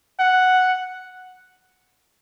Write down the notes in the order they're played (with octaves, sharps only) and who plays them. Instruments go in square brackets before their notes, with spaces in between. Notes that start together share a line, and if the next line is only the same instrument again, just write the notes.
[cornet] F#5